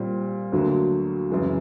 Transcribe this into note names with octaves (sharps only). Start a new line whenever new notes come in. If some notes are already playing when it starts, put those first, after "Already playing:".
Already playing: A#2 G3 C4
D2 D3 F#3 A#3
F#2 C#3 E3 G#3